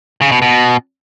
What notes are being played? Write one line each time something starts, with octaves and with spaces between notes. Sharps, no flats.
C#3
B2
B2